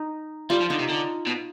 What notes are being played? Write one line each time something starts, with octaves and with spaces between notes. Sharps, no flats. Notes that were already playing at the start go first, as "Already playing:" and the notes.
Already playing: D#4
G3 F4
F3
D3 D#4
C3
D3
B2